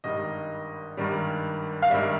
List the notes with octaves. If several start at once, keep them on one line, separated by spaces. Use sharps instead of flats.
G#1 G2 D#3 G3 D#5
G#1 G2 D#3 G3
F5
G#1 G2 D#3 G3 E5